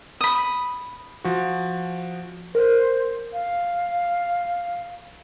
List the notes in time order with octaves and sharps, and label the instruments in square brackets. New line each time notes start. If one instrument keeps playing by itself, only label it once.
[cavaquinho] B5 D#6
[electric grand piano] F3 F#4
[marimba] A#4 [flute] C5
[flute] F5